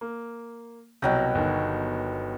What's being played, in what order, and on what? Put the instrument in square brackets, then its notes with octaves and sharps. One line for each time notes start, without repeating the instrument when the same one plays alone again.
[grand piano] A#3
[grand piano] C2 [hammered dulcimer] B2 F#3 G5
[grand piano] G1 D#3